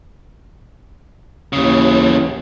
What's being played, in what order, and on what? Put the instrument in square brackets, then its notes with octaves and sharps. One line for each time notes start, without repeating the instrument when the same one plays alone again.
[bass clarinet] D#2 [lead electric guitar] C#3 E3